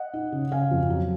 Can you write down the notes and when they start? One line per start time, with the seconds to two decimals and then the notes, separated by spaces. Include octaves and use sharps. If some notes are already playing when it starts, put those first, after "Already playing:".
Already playing: D#5 F#5
0.13 D#4
0.32 C#3
0.52 C#3 F5 G#5
0.71 F2
0.90 F#3